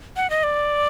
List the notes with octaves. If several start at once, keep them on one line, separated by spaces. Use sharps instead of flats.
F#5
D#5
D5